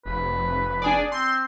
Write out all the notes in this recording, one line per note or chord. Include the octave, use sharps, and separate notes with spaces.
F1 B4
D4 G#4 D5
C4 C6